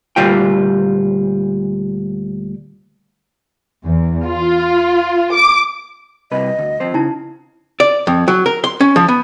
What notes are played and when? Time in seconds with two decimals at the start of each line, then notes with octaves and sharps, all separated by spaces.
0.16 D2 A#2 G3 F4 G5
3.82 E2
4.26 F4
5.33 D6
6.32 C2 C3 B4 D#5
6.58 D2
6.80 F3 C4 C5
6.94 C#3 D#4 E4 A5
7.80 D5
8.07 F2
8.28 F#3
8.46 A#4
8.64 C6
8.81 C#4
8.96 F3
9.08 B3